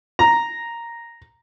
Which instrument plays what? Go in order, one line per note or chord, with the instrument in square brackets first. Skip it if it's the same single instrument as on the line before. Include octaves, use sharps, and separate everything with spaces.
[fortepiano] A#5